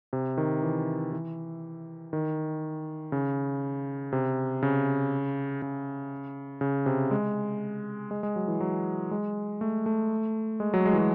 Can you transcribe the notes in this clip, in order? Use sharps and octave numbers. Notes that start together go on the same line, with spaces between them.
C3
D#3
E3
E3
D#3
C#3
C3
C#3
C#3
C#3
C3
G#3
G#3
G#3
F#3
E3
F#3
G#3
A3
A3
G#3
F#3
G#3
E3
F#3